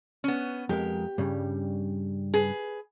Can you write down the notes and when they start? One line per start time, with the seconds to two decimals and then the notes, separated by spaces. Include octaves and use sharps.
0.24 B3 C#4
0.69 F2 G#3 G4 A#4
1.18 G2 C#3 G3
2.34 G#4 B4